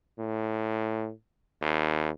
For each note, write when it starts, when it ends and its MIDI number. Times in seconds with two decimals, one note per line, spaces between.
0.19 1.11 45
1.62 2.10 39